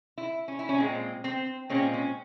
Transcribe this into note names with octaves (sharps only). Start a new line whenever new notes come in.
E4
C#4
E4
C#4
A#2 G#3 C4
C4
A#2 G#3 C4 C#4
C#4